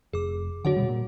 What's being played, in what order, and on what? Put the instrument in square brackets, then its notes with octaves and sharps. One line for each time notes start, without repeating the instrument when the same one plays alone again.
[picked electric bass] F1 [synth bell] G#4 D6
[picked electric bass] D3 F#3 D4 [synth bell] F#4 C#5 F#5
[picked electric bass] F1 B2 G3
A#2